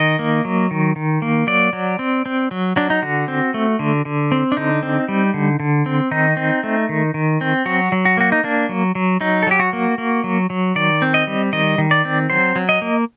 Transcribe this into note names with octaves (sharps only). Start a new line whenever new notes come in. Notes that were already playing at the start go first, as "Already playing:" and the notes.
Already playing: D#3 D#5
A#3
F#3
D#3
D#3
A#3
F#3 D5
F#3
C4
C4
F#3
F#3 D4
D#4
D3 F#4
C4
A3
D3
D3
C4
D4
D3 D#4
C4
G3
D3
D3
C4
D#3 D#4
C4
A3
D#3
D#3
C4
F#3 F#4
F#3
F#4
A#3 F#4
D#4
A#3 D4
F#3
F#3
F#3 D#4
A4
F#3 G4
F#4
A#3
A#3
F#3
F#3
D#3 D5
C4
D#5
G3
D#3 D#5
D#3
D5
C4
F#3 C5
F#3
D#5
A#3